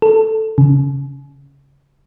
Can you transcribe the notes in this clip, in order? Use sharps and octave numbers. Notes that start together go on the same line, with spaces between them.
A4
C#3